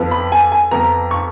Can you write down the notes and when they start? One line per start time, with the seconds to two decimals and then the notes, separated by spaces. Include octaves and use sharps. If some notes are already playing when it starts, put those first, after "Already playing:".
Already playing: F2 F3 B3
0.11 B5
0.32 G#5
0.52 G#5
0.71 F2 F3 B3 A#5
1.11 C#6